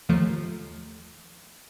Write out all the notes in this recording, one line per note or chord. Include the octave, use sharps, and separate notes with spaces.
D#2 F3 A3